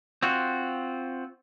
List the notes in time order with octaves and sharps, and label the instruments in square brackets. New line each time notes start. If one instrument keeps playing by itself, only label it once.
[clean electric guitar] C4 F4 F#4